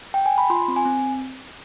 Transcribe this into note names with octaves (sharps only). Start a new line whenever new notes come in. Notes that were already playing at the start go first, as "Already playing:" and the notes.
G5
G#5
B5
F4 C6
C4
G#5
C4